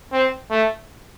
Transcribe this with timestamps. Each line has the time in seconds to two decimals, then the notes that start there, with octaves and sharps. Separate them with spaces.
0.13 C4
0.51 A3